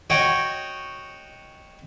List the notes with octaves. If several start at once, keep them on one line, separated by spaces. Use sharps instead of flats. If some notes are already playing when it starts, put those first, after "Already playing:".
F#4 C#5 D#5 G5